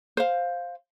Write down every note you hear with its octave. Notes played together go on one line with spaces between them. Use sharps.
C5 F5